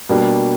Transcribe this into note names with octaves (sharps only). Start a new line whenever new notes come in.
B2 G3 A#3 D4 G4